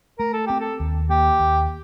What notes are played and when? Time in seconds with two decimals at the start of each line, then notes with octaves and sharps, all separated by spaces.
0.19 A3 A#4
0.33 A4
0.47 C4 G4
0.60 A4
0.80 D#2
1.10 A#3 G4
1.40 D#2